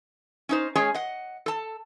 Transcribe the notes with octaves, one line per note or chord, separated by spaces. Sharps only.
C#4 D#4 C5
G#3 C#4 G#4 C#5 G#5
D#5 F#5
A4 A5